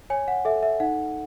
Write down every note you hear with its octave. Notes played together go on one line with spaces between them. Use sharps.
C#5 G#5
F#5
A4 E5
E5
D#4 F#5